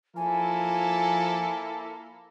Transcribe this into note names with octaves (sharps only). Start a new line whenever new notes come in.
F3 A#3 E4 A4 G#5